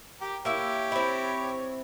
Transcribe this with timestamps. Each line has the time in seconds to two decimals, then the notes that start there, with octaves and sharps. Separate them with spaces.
0.21 G4 A#4
0.45 A#3 E4 G4 C#5 E5
0.92 C4 E4